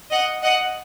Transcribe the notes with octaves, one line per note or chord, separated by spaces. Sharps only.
D#5 F#5
D#5 F#5